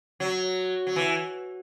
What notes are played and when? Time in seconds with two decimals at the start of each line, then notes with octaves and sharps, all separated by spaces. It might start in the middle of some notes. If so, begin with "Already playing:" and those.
0.20 F#3
0.87 F#3
0.96 E3